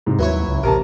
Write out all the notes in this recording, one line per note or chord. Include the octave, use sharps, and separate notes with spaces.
G#2 C3
D#2 F#3 E4 B4 C#5
C#2
A1 C3 A#4 A5